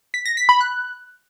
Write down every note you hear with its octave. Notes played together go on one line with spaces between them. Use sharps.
B6
A#6
B6
B5
F#6